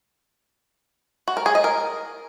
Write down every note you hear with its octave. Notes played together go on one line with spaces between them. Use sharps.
F#4
A#4
G#4
D#5
A#4